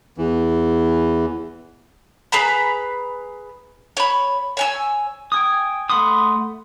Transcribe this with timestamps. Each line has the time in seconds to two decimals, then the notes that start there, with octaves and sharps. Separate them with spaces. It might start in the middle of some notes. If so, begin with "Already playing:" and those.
0.18 E2 E3
2.32 G#4 B4 A#5 B5
3.97 C#5 B5
4.57 C#5 G#5 E6
5.32 G5 G#5 D#6
5.90 A3 F#5 B5 C6 D#6